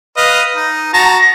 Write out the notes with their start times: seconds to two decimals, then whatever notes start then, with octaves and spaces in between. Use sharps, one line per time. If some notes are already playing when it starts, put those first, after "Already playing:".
0.17 B4 D#5 F5
0.56 D#4
0.94 F#4 A5 A#5 A#6